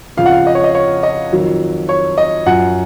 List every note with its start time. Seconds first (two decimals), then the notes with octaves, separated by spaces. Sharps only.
0.17 F2 C#3 F3 F5
0.26 F#5
0.32 F5
0.47 D#5
0.55 C#5
0.64 D#5
0.75 C#5
1.03 D#5
1.32 F2 D#3 F#3
1.89 C#5
2.18 D#5
2.46 F#2 F3 F#5